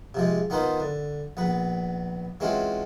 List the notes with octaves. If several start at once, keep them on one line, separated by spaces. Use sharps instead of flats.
C3 F3 G#3
D#3 B3 D#4 F4 B4 C5
D3
A#1 B3 B4
E3 G#3 C4 C#4 F4 F#4